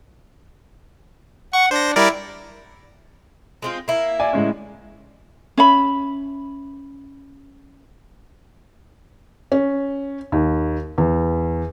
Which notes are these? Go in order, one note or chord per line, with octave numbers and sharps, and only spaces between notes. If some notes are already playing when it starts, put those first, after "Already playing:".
F#5 C#6
D4 C5 A#6
G3 E4 A#4 D5
G#3 C4 F4
A#3 E4
D5 G#5
A2 G#3 C#4
C#4 E5 B5
C#4
D#2
E2